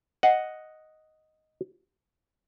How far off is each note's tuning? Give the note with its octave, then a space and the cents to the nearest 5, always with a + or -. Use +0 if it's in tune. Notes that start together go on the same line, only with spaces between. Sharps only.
D#5 +0 F#5 +0